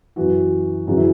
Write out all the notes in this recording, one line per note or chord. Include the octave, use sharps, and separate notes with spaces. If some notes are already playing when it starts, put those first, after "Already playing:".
F#2 E3 F#4
F#2 C#3 E3 F#4
E4